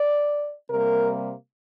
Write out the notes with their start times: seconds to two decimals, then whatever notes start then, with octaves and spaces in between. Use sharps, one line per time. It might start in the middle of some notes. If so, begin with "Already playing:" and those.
Already playing: D5
0.70 C3 G3 A#3 A#4